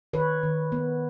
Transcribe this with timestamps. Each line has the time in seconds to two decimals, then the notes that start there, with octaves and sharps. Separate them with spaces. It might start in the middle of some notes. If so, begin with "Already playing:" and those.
0.13 D#3 B4 C#5
0.43 D#3
0.72 B3